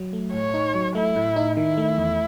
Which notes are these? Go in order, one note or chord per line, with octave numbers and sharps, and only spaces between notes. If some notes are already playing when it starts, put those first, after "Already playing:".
Already playing: F#3
A3
A2 C#5
D#4
F#3
A3 E4
A2
D#4
D#3 E4
A3
E2